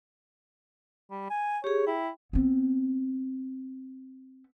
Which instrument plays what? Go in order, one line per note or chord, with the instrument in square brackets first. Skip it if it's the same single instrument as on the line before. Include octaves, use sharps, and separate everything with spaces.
[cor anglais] G3
G#5
[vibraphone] G4 G#4 [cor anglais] C#5
[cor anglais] E4 [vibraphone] G5
[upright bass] B3 C4